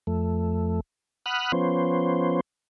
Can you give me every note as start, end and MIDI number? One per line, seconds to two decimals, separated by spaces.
0.07 0.80 41
0.07 0.80 57
1.26 1.52 78
1.26 1.52 83
1.26 1.52 87
1.26 1.52 89
1.26 1.52 90
1.52 2.40 53
1.52 2.40 59
1.52 2.40 61
1.52 2.40 72